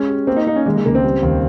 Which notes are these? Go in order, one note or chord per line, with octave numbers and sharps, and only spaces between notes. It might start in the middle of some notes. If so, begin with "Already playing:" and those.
Already playing: G#3 C#4
G4
A#3 C4
D#4
A#3 D#4
C#4
D#3 G#3
G#3
C#2 A#3
C4
G3
D#2